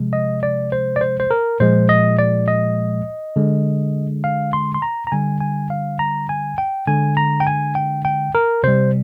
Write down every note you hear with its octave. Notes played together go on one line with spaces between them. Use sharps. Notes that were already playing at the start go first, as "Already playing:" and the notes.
Already playing: C3 F3 G#3
D#5
D5
C5
D5
C5
C5
A#4
A#2 F3 G#3 C5
D#5
D5
D#5
D3 G#3
F5
C6
C6
A#5
A#5
D3 G3 G#5
G#5
F5
A#5
G#5
G5
D3 G#3 G#5
A#5
G5
G#5
G5
G5
A#4
C3 G3 C5